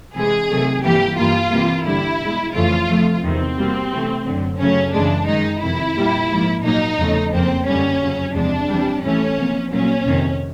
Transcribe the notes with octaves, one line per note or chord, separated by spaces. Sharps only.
C3 E3 G#3 G#4
C3 D#3 F#3 A3
G2 E3 G3 A#3 G4
G2 E3 G3 A#3 F4
C3 E3 G3 A#3
G2 D3 G3 E4
B2 G#3
F2 C#3 E3 A3 F4
C3 F3 A3
E2 C3 D#3 C4
B2 G3 A#3
C3 E3 A3
F#2 D3 F#3
F#2 C#3 F#3 A3 C#4
F#2 C#3 E3 G#3 D4
F#2 D#3 G#3 D#4
F2 C3 D#3 E4
A#2 G3 A#3
G#2 F3 A#3
A#2 F#3 A#3 D#4
E2 C#3 F3 A3
F2 C#3 F3 A#3 C4
F#2 D3 G3 A#3 C#4
F2 C#3 F#3
E2 C3 F3 G#3 D4
C3 E3 G3
A2 E3 A3 C#4
C3 F3 A#3
A#2 F#3 A#3 C#4
F2 C3 D#3